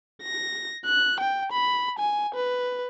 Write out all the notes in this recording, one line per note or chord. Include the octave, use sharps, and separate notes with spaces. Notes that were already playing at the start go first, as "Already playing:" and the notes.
A#6
F#6
G5
B5
G#5
B4